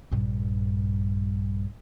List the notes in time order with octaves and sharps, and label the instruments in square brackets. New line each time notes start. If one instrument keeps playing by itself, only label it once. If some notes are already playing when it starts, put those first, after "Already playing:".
[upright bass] A#1 G2